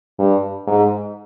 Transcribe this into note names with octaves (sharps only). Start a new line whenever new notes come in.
G2
G#2